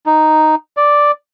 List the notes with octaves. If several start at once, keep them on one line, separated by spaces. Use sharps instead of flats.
D#4
D5